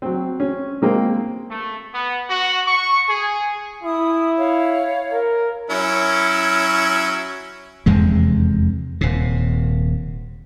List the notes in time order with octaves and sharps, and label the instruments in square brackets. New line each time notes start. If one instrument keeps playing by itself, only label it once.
[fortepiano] F#3 C4
C#4
G#3 A#3 C4
[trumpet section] A3
B3
F#4
C#6
G#4
[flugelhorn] E4 [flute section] D#6
[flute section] C#5 F5
[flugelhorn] A#4
[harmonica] F#3 C#4 E4
[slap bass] F1 E2 C3 G#3
D#1 C3